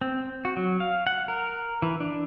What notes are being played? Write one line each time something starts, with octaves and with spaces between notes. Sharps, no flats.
C4
F#4
F#3
F5
F#5
A#4
E3
D4